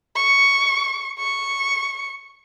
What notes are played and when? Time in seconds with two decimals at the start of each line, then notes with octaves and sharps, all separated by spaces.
0.16 C#6
1.19 C#6